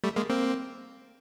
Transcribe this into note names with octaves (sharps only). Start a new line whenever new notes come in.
G3 A3
G#3 A#3
A#3 C4